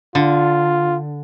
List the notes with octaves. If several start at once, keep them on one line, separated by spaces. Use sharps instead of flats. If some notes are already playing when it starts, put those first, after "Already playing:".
D3 F4